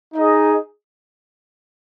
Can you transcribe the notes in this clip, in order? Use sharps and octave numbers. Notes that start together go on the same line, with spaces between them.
D#4 G#4 D#5